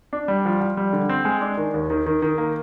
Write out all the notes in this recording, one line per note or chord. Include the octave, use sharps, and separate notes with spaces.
D4
G3
F3
F3
G3
D3
C4
G#3
D4
D#3
D#2
D#3
D#3
D#3
A#3